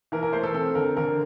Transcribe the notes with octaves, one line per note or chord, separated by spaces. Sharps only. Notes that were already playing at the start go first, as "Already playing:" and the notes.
E3 A#4
A#4
A3 C5
A4
C4 A4
D3 A#4
D3 A#4